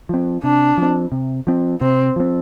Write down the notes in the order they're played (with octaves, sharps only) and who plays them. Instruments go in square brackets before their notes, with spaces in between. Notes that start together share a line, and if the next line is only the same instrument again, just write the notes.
[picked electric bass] F3 C4
[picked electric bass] C3 [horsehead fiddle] D4
[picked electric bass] F3 C4
C3
F3 C4
[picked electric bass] C3 [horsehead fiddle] C4
[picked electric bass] F3 C4